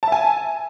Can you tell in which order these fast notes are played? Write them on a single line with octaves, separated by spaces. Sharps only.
A5 E5 G#5